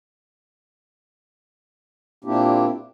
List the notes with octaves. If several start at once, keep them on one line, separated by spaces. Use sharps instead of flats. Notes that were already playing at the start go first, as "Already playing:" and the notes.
A#2 A#3 C4 D4 E4 G4